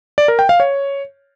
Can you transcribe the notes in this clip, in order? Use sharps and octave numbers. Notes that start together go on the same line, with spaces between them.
D5
A#4
G5
F5
C#5